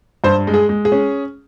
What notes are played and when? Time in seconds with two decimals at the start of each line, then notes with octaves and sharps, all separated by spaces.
0.24 G2 C5
0.47 G#3
0.54 G#4
0.69 G#3
0.85 G#4
0.92 C#4